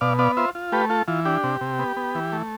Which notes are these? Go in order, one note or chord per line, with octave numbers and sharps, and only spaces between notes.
B2 D5 F5
B3 D5 F5
F4 C5 E5
F4
A3 G4 B4
F4 A4
E3 F4
D4 G4
C3
C3
B3
B3
E3
A3